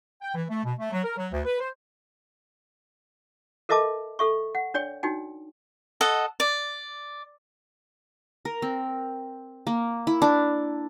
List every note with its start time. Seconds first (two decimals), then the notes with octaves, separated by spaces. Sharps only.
0.21 G5
0.34 E3
0.49 A3
0.64 B2
0.79 A3
0.92 F#3
1.04 A#4
1.17 F#3
1.32 D2
1.45 B4
1.60 C5
3.69 A4 A#4 D#5 E5 A5 D6
4.19 A4 E5 C#6
4.55 F#5
4.74 D4 C#5 D5 G5
5.03 D4 D#4 F#4 G5
6.01 A4 D#5 F#5
6.40 D5
8.45 A#4
8.62 C4
9.67 A#3
10.07 E4
10.22 D4